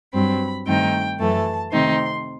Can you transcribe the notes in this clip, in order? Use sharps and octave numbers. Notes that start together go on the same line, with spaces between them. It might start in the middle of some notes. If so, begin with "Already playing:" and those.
G2 F#3 C4 B5
G2 D#3 A3 C4 D#4 G5
F#2 E3 A3 A5
C3 D#3 A3 C4 D#4 C6